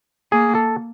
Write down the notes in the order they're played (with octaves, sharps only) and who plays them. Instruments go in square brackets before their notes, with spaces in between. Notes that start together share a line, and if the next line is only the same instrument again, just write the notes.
[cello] A#3 [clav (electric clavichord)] G#4
[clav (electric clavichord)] A4